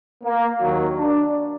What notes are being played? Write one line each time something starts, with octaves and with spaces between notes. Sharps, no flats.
A#3
D#2 D#3 F#3
D4